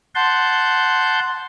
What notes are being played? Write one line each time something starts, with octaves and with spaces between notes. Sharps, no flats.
F#5 A5 C6 G6